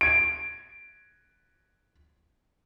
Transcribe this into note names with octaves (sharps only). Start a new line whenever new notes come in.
G#6 D7